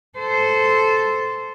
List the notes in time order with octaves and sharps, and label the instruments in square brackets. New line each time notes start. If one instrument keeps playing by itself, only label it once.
[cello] A4 C5